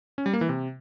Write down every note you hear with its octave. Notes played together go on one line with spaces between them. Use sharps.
C#4
G3
A#3
E3
C3